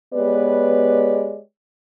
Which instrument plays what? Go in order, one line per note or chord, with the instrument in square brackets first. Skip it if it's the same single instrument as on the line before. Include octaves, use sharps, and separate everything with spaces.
[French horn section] G#3 B3 G4 B4 C#5 D5